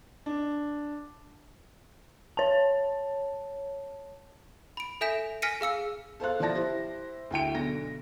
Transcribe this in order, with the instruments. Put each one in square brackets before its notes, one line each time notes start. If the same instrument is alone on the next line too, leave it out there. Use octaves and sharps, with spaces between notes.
[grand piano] D4
[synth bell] C#5 A5
[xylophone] B5 D7
A4 E5 G#5 G6 B6 E7
G#5 F6 A#6 B6 C#7 D#7
G#4 F5 E6 C#7
[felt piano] A4 C5 F5 F#6
F3 E4 D5 A5 A#6
E4 G4 C5
D2 E4 G5 D7
B1 D3 A#6